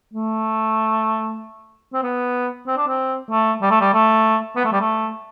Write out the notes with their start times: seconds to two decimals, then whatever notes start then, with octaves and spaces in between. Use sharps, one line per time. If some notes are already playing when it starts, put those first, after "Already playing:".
0.14 A3
1.93 C4
2.03 B3
2.67 C4
2.77 D4
2.88 C4
3.31 A3
3.62 G3
3.71 A3
3.80 G3
3.94 A3
4.56 B3
4.65 A3
4.72 G3
4.81 A3